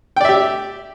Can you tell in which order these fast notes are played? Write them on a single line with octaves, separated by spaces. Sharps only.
G5 D5 E5 G4